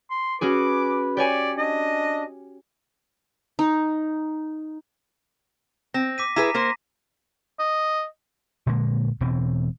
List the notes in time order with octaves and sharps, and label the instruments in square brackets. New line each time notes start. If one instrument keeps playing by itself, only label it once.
[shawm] C6
[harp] C#4 F#4 G#4 [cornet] B4 [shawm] D6
[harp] G4 C#5 G#5 [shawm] D5
[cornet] D4 [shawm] D#5
[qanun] D#4
[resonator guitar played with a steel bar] C4 [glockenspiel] A#6
[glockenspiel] D6 B6 D#7
[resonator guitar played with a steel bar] E4 G#4 B4 [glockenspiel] A#5 B6 D#7
[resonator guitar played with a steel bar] A#3 A#4 C5 [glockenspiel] A#6
[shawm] D#5
[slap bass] A#2 D3 G#3 A#3
E1 B2 E3 C4